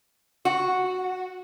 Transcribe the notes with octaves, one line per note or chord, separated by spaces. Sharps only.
F#4